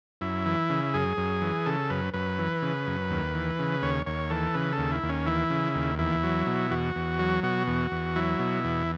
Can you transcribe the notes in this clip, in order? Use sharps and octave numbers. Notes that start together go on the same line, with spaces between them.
F#2 E4
E3
C#3
F#2 G#4
F#2
E3
C#3 A4
F#2 B4
F#2 B4
E3
C#3
F#2
D#2
E3
C#3
D#2 C#5
D#2 C#5
E3 A4
C#3 B4
A4
D#2
E4
D#2
C#4
E3 E4
C#3
D#2
E2 E4
F#3
B2
E2 F#4
E2
F#3
B2 F#4
E2
E2
F#3 E4
B2
E2